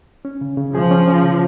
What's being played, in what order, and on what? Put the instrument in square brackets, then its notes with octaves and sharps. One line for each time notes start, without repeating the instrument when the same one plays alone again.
[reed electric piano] C#4
C#3
C#3
[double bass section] F3 [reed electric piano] G#4
[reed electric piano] C#4
C#4
C#3